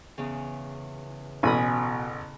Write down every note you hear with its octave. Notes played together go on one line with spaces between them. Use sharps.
E2 C#3
A1 B2 G#5 B5 D#6